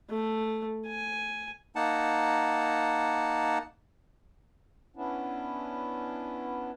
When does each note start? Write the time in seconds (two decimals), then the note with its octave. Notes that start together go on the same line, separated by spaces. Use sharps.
0.11 A3
0.87 G#5
1.76 A#3 D#4 F#5 A5
4.96 B3 C#4 D4 E4